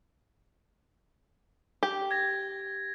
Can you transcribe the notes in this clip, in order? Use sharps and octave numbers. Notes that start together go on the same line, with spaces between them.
G4
G#6 A#6